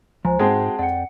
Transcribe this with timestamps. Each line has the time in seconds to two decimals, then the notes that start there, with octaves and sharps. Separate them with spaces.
0.25 C#2 F3 C5 G#5 A#5
0.39 G#2 G#3 C4 F#4 G#4 F#5 G5 A5
0.79 F2 D5 F#5 G5 C#7